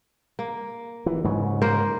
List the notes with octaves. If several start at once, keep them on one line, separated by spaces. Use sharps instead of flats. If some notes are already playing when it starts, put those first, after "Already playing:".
A#3
E3
G#2 C#3 F#3
A#3 A#4 C5